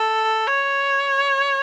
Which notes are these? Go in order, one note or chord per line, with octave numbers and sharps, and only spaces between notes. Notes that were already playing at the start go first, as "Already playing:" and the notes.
Already playing: A4
C#5